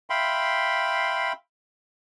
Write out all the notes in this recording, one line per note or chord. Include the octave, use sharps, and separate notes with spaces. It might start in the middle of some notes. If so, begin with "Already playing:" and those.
E5 F5 G5 B5 C6